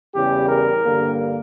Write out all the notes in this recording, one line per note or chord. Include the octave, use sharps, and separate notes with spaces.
E2 C#3 G3 G4
A#4
G2 D3 G3 A#3